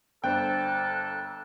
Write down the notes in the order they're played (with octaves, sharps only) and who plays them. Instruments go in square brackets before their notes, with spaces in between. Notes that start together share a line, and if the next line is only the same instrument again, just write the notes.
[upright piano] G1 D4 C5 [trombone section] A#3 A4 [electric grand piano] G5 [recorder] F#6